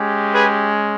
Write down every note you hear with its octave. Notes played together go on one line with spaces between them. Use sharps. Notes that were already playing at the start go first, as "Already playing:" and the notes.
Already playing: G#3 C#4 G4
G#4 B4